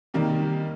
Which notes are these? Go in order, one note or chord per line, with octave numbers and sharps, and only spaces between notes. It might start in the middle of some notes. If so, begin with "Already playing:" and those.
C3 D#3 G3 A#3